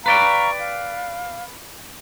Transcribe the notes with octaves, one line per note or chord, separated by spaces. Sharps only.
B4 D5 F5 G5 A#5 C#6
F5